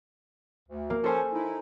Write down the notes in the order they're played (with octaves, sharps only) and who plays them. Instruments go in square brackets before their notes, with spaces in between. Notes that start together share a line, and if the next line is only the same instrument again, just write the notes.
[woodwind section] D2
[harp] A#3
[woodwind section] F3 C#4 [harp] A4 C5 G#5
[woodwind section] D#4 E4